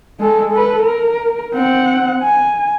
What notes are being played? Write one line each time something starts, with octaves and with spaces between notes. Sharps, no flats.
G#3 A4
A4 B4
A#4
C4 F#5
G#5